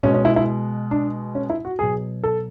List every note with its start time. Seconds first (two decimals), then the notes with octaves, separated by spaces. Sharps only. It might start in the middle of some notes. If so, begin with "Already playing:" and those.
0.03 B2 G#3 C#4
0.14 C#4
0.25 E4
0.36 E4
0.91 D4
1.35 C#4
1.50 E4
1.65 F#4
1.79 B2 F#3 G#4
2.24 A4